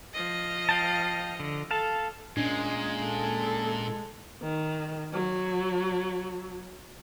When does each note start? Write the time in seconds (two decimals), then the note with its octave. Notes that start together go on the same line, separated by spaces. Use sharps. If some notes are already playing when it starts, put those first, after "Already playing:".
0.14 F3 D#5
0.69 F5 G5 A5
1.40 D3
1.71 A4 F5 A5
2.37 A#2 G#3 C#4 D4
3.05 A4
4.42 D#3
5.13 F#3